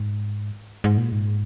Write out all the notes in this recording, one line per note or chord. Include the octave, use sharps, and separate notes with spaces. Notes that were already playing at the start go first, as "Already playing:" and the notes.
Already playing: G#2
G#2
A#2
G#2